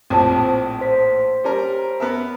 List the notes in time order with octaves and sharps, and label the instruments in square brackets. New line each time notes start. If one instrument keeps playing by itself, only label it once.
[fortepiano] A#1 A2 F3 [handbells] C4 C5 A5
[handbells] C5 B6
[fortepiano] G3 C#4 A#4
B3 A#4 E5